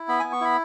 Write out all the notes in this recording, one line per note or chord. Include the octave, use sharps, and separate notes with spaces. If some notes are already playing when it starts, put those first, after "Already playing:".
Already playing: E4
B3 B5
B3 G#5
C#6
E4 B5